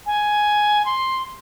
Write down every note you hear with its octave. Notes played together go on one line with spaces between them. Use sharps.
G#5
C6